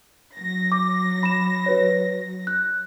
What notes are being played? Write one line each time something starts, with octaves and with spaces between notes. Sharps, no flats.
F#3 A#6
D6
B5 E7
F#4 B4 C#5
F#6